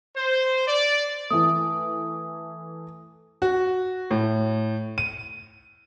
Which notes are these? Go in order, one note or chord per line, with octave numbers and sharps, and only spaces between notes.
C5
D5
E3 A3 D#6
F#4
A2
D#7